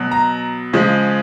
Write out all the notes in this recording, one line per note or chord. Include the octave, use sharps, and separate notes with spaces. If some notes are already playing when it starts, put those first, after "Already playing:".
Already playing: B2 F#3
A#5
C#3 F3 G#3